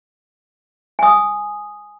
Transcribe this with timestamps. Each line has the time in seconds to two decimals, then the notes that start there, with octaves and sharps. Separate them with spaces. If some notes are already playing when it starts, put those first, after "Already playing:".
0.99 G#5 D#6